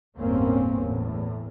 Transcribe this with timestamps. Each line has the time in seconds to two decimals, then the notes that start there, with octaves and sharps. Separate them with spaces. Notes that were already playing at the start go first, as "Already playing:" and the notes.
0.17 G1 E2 A2 A#3 C4 C#4
0.77 E2 A2